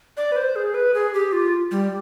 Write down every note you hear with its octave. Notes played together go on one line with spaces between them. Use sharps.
D5
B4
C5
G#4
B4
G#4
G4
F4
G3